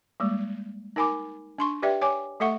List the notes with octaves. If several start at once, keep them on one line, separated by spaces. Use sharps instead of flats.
G3 G#3 A#3
D#4 A#4 G#5 B5 D6
D4 C6 C#6
G4 B4 D5 E5 G5
C#5 G#5 D6
A3 A4 E5 F#5 C#6